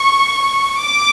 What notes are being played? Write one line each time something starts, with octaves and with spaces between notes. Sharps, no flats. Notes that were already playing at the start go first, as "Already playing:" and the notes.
Already playing: C#6
D6